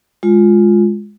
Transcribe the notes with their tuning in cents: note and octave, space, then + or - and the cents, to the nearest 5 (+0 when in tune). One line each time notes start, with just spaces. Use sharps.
G#3 +0 F4 +5